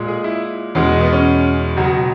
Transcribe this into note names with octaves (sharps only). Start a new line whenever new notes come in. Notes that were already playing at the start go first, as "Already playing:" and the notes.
Already playing: A#2 G#3
G#4
E4
E2 B2 G#3 C#4
B3
B3
C#4
C#2 B2 F#3